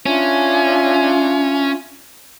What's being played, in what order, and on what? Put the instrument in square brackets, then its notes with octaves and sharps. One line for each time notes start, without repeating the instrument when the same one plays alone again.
[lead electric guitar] C#4 [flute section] D4 F4 E5